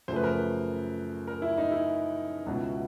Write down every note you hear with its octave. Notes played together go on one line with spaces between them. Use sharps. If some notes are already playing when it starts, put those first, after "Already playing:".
F#2 C#3 F3 A3 C5
B4
A#4
B4
A#4
E4
D#4
E4
C#2 B2 F#3